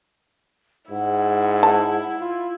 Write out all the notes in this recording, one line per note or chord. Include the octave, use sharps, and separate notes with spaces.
G#2 E4 F#5
A5
F4